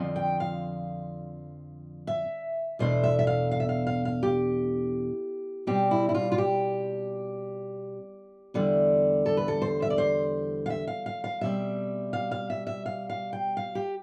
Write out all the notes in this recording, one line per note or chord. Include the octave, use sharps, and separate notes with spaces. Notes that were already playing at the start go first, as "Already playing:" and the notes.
Already playing: F2 D3 F3 C4
G5
F5
E5
E2 B2 A3 D4 C5
E5
E5
F5
F5
E5
F5
F5
F5
G4
B2 G3 C4 G4
E4
E4
F4
F4
G4
E2 D3 G3
A4
B4
A4
C5
E5
D5
C5
F5
E5
F5
F5
F5
B2 G3 C4 E5
F5
F5
E5
E5
F5
F5
G5
F5
G4